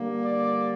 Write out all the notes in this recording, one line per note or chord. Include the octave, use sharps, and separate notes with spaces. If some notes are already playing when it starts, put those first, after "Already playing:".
Already playing: D3 G3 A#3
D5